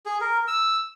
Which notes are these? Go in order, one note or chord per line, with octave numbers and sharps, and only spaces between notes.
G#4
A#4
E6